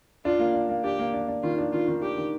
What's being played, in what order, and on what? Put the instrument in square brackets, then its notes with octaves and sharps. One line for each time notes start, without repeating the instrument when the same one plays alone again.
[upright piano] D4 [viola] F4
[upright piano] A#3
D4
A#3
[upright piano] D4 [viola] G4
[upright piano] A#3
D4
D4
[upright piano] D#3 [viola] F4
[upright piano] D4
[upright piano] D#3 [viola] F4
[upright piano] D#3
[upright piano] D4 [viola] G4
[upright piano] D#3